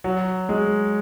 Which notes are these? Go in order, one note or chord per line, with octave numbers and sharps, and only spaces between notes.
F#3
G#3